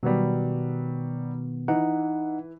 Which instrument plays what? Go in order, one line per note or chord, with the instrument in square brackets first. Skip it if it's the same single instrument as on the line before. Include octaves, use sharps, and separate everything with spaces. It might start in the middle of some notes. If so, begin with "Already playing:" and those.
[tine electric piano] B2 D#3 B3 [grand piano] F#3 G3
[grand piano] E3 [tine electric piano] D#4 F#5